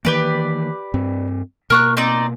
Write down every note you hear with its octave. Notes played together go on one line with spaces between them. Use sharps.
D#3 E3 A#3 G4 B4 D5
G2 C4
B2 A#3 A#4 C#6 F#6
C4 D#4 D5